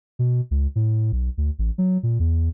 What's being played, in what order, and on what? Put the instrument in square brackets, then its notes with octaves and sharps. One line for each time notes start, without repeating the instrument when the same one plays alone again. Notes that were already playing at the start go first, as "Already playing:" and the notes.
[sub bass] B2
C#2
A2
B1
D2
A1
F#3
A#2
E2